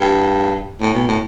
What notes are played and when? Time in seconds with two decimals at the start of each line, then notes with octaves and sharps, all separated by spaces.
0.01 G2
0.81 A2
0.94 B2
1.08 A2